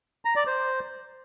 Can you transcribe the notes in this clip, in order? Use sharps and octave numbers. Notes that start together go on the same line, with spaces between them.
A#5
D5
C5